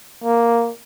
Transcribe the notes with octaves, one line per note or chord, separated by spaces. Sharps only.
A#3